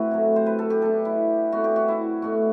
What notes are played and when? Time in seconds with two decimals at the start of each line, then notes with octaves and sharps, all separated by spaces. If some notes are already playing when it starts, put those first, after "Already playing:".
Already playing: A2 C4 E4 F#4 B4
0.11 C3 F#3 A3
0.36 C5
0.46 B4
0.59 A4
0.70 G4
0.82 B2 A3 D4 A4
1.05 E4
1.52 B2 A3 C4 F#4
1.64 G4
1.76 F#4
1.88 E4
2.22 B2 A3 D4 F#4